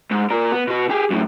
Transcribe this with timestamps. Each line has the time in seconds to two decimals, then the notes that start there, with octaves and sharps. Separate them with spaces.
0.11 G#2
0.31 A#2 A#4
0.52 B3
0.68 B2 F#4
0.90 G4 G#4
1.11 F#2 A2